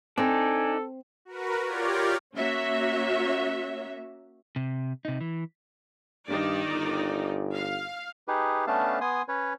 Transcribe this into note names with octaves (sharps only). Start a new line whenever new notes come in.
C4 D4 D#4 A4 G#5
F#4 A#4 B4
F4 G4 A#4 C#5 D5
A#3 C#4 F#4 C#5 E5
C3
C3 D#4
E3
G2 D#3 D#4 D5
G1
F5
D#4 G4 G#4 B4
A3 B3 C#4 D4 F5 A5
B3 G#5 C6 D#6
C#4 B4 C#5